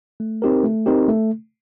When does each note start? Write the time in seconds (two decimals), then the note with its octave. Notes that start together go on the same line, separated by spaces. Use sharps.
0.20 A3
0.42 C4 D#4 G4 A#4
0.64 A3
0.86 C4 D#4 G4 A#4
1.08 A3